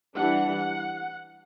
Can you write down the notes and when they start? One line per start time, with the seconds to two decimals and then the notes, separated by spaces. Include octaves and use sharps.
0.16 E3 G3 D4 F#5